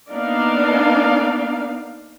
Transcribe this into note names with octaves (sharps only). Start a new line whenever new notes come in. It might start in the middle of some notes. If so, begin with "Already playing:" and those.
A#3 B3 D4 D#4 D5 F5